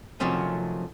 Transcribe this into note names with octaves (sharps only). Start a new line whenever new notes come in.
C3 D#3 F3 F#3 A3 C#4